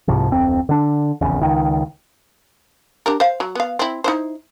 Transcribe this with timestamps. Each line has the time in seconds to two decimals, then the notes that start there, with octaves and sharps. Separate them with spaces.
0.08 C2 G#2 C3 F3
0.30 D1 F2 C4
0.69 D3 D4
1.21 F1 A#1 E2 C#3
1.41 C#2 D#3
3.06 D4 G4 A#4
3.20 C5 F5
3.40 F#3
3.55 B3 F5
3.79 C4 E4
4.04 D#4 E4 C5